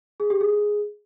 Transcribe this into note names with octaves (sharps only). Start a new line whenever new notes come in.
G#4
G4
G#4